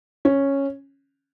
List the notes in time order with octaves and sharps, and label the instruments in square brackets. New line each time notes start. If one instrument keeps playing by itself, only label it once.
[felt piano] C#4